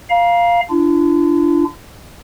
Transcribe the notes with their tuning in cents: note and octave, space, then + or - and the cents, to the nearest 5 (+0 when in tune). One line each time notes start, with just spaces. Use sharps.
F5 +0 A#5 +30
D4 +0 F4 -45